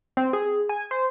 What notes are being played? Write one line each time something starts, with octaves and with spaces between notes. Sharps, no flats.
C4
G#4
G#5
C5